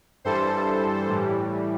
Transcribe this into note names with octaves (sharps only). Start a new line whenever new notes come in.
G2 E3 G3 A4 C5
A2 E3 G3